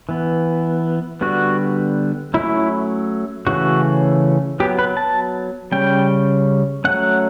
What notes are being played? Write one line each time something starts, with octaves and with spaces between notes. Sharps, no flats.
E3 B3
D3 G3 B3 F#4
F#3 A3 C#4 E4
C#3 E3 A3 C#4 F#4
F#3 B3 G4
B4
A5
C#3 G3 C#4 G5
F#3 A3 C#4 F#5